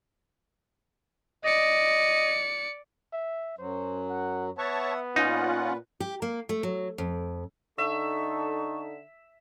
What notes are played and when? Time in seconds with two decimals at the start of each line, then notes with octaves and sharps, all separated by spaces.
1.44 D5 D#5 C#7
3.13 E5
3.58 F#2 F#3 C5
4.10 F#5
4.58 B3 C#5 E5 F#5 A5 C#6
5.16 A#2 C#4 D#4 F4 B4 F#5
6.00 G4
6.22 A#3
6.49 A3
6.63 F#3
6.98 F2
7.78 D3 D#4 A4 E5 C#6